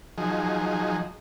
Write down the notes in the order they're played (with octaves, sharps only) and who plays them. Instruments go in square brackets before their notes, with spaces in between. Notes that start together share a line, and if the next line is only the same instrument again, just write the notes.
[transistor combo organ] F3 F#3 D#4 G#4